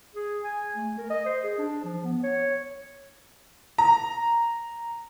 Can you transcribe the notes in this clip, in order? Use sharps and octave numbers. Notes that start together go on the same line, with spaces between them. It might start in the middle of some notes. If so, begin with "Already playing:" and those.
G#4
G#5
A3
A#4
D#5
C5
G#4
D4
F3
B3
C#5
A#5